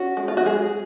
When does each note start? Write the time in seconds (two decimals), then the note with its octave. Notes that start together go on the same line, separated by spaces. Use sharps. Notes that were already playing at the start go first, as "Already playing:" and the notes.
Already playing: C#4 F#4
0.17 G#3
0.28 F4
0.37 F#4
0.45 G#3 G#4